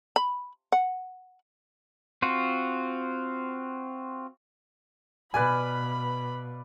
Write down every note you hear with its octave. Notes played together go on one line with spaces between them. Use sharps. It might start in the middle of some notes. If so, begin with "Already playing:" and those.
B5
F#5
C4 F4 F#4
B2 B4 D5 F5 G#5 B5